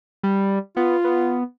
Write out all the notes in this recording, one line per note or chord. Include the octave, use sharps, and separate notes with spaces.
G3
B3 F4
B3